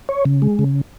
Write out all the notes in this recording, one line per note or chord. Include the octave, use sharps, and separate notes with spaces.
C#5
C#3
G#3
C#3